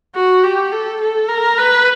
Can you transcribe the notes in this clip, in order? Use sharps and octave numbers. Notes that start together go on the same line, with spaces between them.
F#4
G4
A4
A4
A#4
B4